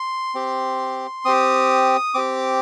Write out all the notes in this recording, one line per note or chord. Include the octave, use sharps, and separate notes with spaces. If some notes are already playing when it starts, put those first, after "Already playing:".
Already playing: C6
C4 G4
C4 G4 D#6
C4 G4 D6